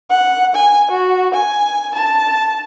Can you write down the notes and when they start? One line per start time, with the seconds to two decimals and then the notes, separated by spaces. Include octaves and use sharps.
0.10 F#5
0.56 G#5
0.91 F#4
1.34 G#5
1.95 A5